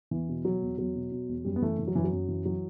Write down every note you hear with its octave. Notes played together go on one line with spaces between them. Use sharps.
E2 E3
B2
B2 F#3
E2
E2 F#3
B2
B2
E2
F#2 G3
B3
E3 A3
E3
F#3
F#2 E3
F#3
F#2
E3
E3 F#3